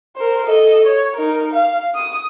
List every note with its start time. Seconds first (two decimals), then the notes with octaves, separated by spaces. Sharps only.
0.16 A#4 C5
0.46 A4 D#5
0.85 C#5
1.17 D#4 A#4
1.54 F5
1.95 D#6